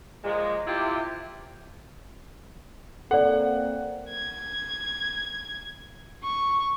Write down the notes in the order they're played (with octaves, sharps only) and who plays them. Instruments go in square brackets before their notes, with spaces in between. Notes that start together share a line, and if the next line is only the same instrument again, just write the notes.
[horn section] A#2 F3 G#3
C3 E4 F4 G4
[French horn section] A#3 C4 [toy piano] A4 D5 [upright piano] F#5
[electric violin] G#6
C#6